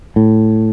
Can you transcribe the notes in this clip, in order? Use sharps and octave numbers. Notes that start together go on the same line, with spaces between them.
A2